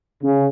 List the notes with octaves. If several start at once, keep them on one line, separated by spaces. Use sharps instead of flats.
C#3